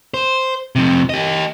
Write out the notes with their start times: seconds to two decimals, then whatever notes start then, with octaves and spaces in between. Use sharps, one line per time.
0.14 C5
0.76 F2 C3
1.09 G4 D#5